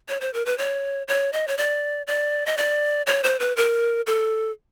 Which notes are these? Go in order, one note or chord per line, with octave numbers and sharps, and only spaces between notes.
C#5
C5
A#4
B4
C#5
C#5
D#5
C#5
D5
D5
D#5
D5
C#5
C5
B4
A#4
A4